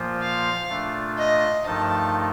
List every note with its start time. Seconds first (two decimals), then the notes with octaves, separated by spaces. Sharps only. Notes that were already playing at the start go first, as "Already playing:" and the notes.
Already playing: A#2 F3 A#3 F4 C5
0.21 F5
0.69 A#2 A3 D4 F4
1.18 D#5
1.66 G2 F3 A3 D#4 A#4 A5